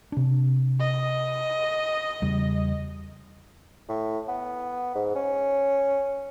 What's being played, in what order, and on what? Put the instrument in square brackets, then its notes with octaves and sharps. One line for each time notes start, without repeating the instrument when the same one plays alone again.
[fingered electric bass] C3 D4
[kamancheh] D#5
[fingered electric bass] E2 C#3 G3
[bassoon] A2
B3
G#2
C#4